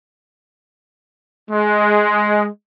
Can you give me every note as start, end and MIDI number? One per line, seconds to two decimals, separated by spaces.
1.50 2.48 56